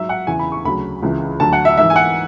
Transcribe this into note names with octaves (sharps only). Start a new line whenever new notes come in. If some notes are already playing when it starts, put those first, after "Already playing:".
Already playing: G#2 F#3 E5
F#5
E2 C#3 E3 G#5
B5
C#6
D2 C#3 F#3 B5
C#2 C#3 E3
D2 D3 F#3 A5
F#5
E5
G#2 E3 E5
G#5
F#5